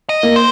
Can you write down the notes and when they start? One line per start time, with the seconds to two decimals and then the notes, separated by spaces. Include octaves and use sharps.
0.09 D#5
0.23 A#3
0.36 C5